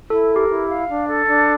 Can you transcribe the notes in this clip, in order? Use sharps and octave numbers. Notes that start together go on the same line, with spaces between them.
E4 A4
A#4
G4
E4
F5
D4
A4
D4